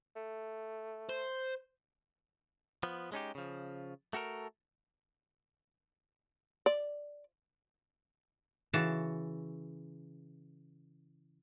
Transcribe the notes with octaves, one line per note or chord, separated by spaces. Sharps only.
A3
C5
F3 B3
G#3 C#4 D#4 G4
C#3 F3
A3 F#4 A4 A#4
D5
C#3 E3 F#4 A5